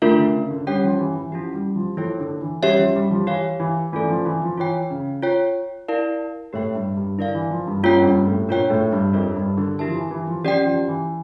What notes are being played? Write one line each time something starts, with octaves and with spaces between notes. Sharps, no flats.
D3 A3 D4 F4 A#4 E5
D3
C#3
D3
G3 C#4 G4 C#5 G5
F3
E3
E3
F3 C#4 E4 G4
G3
F3
F3 A#3 E4 A4 C#5 G5
D3
E3
G3 C#4 G4 C#5 E5
F3
G3
F3
E3 G4 C#5 F5
E3
E3 A3 C#4 F4 A4 D5
F3
E3
F3
E3 F4 C#5 G5
C#3
F4 C#5 G5
E4 A#4 D5 F5 A5
A2 G4 C#5 E5 G5
G2
G2
D3 E4 A#4 D5 F5
E3
F3
G2
G2 A#3 C#4 F4 C#5 G5
F2
G2
A2
A#2 D4 F4 C#5 G5
A2
G2
F2 D4 F4 A#4 C#5 E5
G2
D3
E4 G4 A#4 E5 A5
F3
E3
E3
F3
F3 C#4 G4 D5 G5
F3
E3